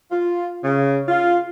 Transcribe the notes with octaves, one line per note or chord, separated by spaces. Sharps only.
F4
C#3
F4